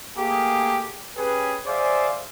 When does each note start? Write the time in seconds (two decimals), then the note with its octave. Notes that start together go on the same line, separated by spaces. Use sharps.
0.17 A3 A#3 G4 G#4
1.17 C#4 G4 G#4 B4
1.66 G#4 C5 D5 E5 F5 G#5